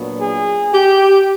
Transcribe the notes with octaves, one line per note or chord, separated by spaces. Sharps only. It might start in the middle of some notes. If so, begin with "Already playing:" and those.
Already playing: A#2 F#3 B3 D4
G#4
G4